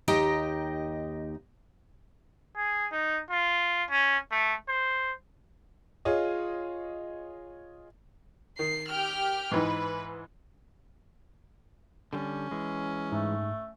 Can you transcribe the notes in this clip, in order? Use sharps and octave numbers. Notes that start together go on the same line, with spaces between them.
D#2 D#4 G4 D#5 G5
G#4
D#4
F4
C#4
A3
C5
F4 G#4 C#5 D#5
D#3 C7
G4 G5 F6
G#2 E3 D#4 B4
D3 G3 C#4
E3 G#3
G#2 A3